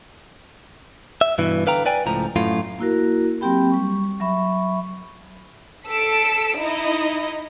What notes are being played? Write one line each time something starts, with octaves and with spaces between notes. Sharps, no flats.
E5
G2 B2 E3
D3 B4 F5 G5 A#5
B4 D5 G5 G#5
C#2 A2 F3 A#5
F#2 A2 F4
A#3 E4 F#4 A#4
F#3 A#3 C4 G4 G5 B5
G3 C#6
F#3 E5 B5 C#6
A4 E6 B6 D7
D#4 E4 D#5